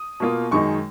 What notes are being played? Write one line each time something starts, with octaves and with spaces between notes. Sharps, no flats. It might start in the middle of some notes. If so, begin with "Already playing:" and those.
Already playing: D#6
B2 A#3 F4
F#2 D#3 G#3 D#4 C#6